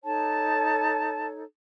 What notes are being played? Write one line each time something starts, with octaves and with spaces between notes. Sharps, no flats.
D#4 A4 C#5 A5